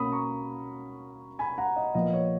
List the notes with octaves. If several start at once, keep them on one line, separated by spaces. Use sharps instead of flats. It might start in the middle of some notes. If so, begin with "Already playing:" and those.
Already playing: B2 A#3 C#4 B5 D#6
A#5 C#6
G#5 B5
F#5 A#5
D#5
A#2 F3 B3 D#5
C#5